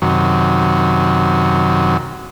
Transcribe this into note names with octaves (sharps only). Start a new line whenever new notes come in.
F#2 C3 D#3 F#3